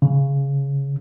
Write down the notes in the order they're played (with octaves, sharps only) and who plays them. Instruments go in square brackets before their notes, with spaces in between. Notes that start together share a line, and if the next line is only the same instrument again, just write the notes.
[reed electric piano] C#3